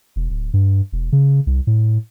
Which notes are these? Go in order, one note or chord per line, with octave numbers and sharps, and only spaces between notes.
E1
D1
G2
E1
C#3
C2
A2